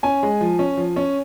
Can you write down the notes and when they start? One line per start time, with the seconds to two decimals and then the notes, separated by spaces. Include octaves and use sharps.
0.03 C#4 G#5
0.23 G#3
0.41 F3
0.59 C#4
0.77 F3
0.96 C#4